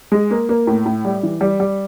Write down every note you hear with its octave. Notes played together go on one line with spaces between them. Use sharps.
G#3
A#3
A#3
A2
A2
G3
E3
G3
G3